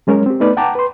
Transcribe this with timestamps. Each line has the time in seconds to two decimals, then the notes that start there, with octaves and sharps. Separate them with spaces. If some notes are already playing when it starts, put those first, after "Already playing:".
0.07 F#3 G#3 C#4 A#4 C#5
0.26 C4 G4
0.40 A3 B3 D#4 B4 D5
0.57 F#5 G5 A5 A#5 D6
0.75 B4 C6